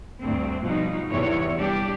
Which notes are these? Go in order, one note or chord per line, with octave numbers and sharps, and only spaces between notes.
D2 G2 C4
B2 F3 G3 D#4
E2 G2 C3 E3 G3 C#5
G3 D4 G4